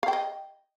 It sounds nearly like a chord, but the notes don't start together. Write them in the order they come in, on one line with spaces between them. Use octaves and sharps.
F5 G5 D#5